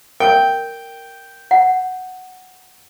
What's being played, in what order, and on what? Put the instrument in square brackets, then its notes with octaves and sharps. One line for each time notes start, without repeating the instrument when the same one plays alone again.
[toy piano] A#4 [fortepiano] G5
[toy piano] F#5